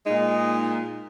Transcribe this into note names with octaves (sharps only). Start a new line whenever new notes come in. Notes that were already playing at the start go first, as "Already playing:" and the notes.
A#2 G#3 D#4